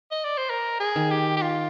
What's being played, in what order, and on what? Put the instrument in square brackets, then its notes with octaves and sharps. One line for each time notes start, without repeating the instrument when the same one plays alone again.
[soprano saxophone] D#5
D5
C5
A#4
G#4
[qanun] D#3
[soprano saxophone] G4
G4
F4